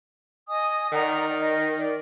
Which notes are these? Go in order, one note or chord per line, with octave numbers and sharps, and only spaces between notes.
D#5 G#5 D#6
D#3 D5 F#5 A#5
D#5
D5